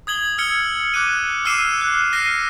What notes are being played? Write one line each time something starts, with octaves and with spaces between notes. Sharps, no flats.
D#6 G#6 F#7 G7
E6 F6 G#6 C#7 G7
D6 F#6 D#7
D6 E6 F6 C7 D#7 E7
F#6
F6 A#6 C7 D#7